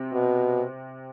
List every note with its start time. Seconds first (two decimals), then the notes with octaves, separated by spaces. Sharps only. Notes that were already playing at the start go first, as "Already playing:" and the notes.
Already playing: C3 C4
0.12 B2